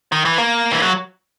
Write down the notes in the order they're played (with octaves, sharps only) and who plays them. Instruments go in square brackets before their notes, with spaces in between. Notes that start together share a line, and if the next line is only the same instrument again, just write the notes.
[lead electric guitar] D#3
E3
A#3
E3
F#3